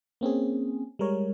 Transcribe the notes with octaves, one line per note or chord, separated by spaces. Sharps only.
A#3 C4 C#4 G#4
G3 G#3 A#4 C#5